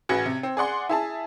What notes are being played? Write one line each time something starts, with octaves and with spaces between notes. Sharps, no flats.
A1 F#4 G#4 B4 G#6 C#7
C3
C4
G#4 D5 F#5 C6
E4 G#4 A5